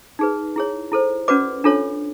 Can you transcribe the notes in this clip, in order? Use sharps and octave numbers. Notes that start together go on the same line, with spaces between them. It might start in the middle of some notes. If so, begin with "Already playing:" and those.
D#4 G#4 B4
E4 G#4 C#5
E4 A4 C5
C#4 F#4 B4 D5 D6
D4 F4 A4 C#5